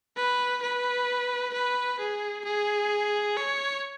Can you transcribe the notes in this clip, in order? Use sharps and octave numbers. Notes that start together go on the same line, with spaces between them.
B4
B4
B4
G#4
G#4
C#5